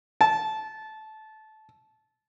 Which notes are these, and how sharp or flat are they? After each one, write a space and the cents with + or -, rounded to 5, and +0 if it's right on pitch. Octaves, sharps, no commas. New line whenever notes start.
A5 -15